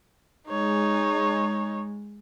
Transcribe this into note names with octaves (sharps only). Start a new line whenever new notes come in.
G#3 D#4 C#5